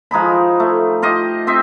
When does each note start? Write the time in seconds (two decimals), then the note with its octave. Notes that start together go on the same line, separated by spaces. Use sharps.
0.11 F3 G#3 D#4 B5
0.60 A3
1.02 F4 G4 D#5
1.47 C4 C5 D#5 E5